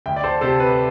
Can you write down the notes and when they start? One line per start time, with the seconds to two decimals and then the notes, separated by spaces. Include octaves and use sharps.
0.06 D2 E5 G5
0.16 D5
0.24 A4 C5
0.41 C3 A4 C5
0.60 B4